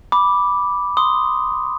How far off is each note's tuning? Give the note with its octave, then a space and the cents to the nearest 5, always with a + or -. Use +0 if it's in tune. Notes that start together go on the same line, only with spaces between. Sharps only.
B5 -5 D6 +0
C6 +0 D#6 +0